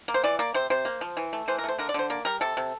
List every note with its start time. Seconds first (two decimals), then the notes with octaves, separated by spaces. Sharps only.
0.08 A#3
0.14 C5
0.24 E3 D5
0.39 A#3 D5
0.54 C3 C5
0.70 C3 C5
0.85 A#3
1.01 F3
1.17 E3
1.33 A3
1.48 E3 C5
1.59 A#4
1.64 A3 C5
1.79 D3 A#4
1.89 D5
1.94 D3 C5
2.10 A#3 D5
2.25 G3 A#4
2.41 C3 A4
2.57 C3